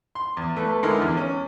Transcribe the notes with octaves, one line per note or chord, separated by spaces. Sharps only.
C6
E2
A3 B4
D3 G#3 D#4 E4 A#4
E2
C#4